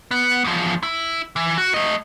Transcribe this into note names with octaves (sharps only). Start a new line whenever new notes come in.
B3
E2 F3
E4
E3
F#4
A3 D#5